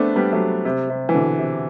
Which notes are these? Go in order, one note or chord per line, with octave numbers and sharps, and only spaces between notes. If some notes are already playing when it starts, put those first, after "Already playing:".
Already playing: A3 B3 C4 D4
G3 B3
F#3 A3
C3
C3
E3
B2 D3
C3